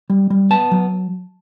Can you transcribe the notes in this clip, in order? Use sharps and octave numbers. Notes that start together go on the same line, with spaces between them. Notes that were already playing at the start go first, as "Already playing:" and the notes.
G3
G3
B3 A5
F#3